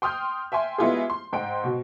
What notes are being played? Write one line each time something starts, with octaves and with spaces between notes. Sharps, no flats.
G5 C6 D#6 F6 G6
E5 G5 G#5 C6
G#3 B3 E4 F4 G4 G#4
C6
G#2 G5 C6 D7
B2